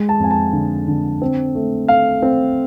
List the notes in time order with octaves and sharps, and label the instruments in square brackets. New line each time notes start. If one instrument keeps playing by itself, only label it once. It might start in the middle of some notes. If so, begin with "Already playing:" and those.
Already playing: [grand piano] G#3
A5
F2 G#5
A5
D3
D3
C4
A3
A3 F5
C4